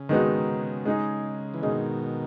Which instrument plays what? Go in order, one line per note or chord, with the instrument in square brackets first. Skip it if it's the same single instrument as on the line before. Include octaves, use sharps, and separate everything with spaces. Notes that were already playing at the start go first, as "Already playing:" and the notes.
Already playing: [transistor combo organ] C#3
[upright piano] D#3 G#3 B3 D#4 F#4
G#3 D#4 G#4
[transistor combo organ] E3
[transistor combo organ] B2 D#3 [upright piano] G#3 D#4 G#4